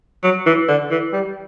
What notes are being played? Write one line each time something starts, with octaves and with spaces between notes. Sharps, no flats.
F#3
E3
D3
E3
G3